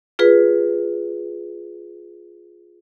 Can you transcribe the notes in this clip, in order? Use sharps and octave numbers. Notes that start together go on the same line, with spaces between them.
F4 G#4 B4